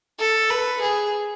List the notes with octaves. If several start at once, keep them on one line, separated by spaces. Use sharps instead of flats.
A4
B4
G#4